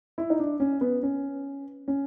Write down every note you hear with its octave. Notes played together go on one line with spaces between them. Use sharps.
E4
D#4
D4
C#4
B3
C#4
C#4